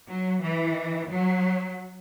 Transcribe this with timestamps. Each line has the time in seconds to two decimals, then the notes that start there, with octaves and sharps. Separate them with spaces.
0.09 F#3
0.43 E3
1.10 F#3